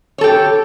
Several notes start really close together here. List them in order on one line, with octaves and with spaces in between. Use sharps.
C#5 A4 G4